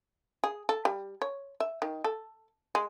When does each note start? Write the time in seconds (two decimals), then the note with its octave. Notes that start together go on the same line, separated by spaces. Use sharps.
0.44 G#4
0.69 A4
0.85 G3
1.22 C#5
1.60 E5
1.82 D#3
2.04 A4
2.75 G#3